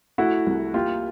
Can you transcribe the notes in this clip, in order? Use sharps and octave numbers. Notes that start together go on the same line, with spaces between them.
A3 E4 F#4
C2
A#3 F4 G4